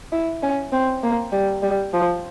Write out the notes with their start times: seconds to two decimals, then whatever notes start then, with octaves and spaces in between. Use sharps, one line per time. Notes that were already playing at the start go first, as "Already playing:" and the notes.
0.12 E4
0.42 C#4
0.72 C4
1.03 A#3
1.32 G3
1.62 G3
1.94 F3